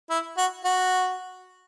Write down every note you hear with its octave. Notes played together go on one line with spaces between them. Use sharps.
E4
F#4
F#4